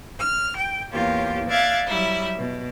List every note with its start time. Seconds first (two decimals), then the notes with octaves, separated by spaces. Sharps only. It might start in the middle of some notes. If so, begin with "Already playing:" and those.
0.19 F6
0.56 G5
0.93 E2 A#3 F4 G4 C#5
1.48 D5 E5 F5 F#6 G#6 A6
1.88 F#3 G3 E4 E5
2.37 B2